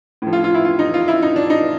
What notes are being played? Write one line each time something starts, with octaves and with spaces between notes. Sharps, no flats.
A2 F3
F4
F4
E4
F4
D#4
F4
E4
D#4
D4
D#4